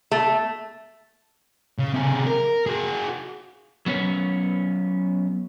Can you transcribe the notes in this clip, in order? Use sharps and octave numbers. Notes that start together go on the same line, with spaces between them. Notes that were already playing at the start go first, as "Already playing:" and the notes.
A3
C#3
C3 G#4
A#4
F#4 G#4
F#3 B3 C#4 C#5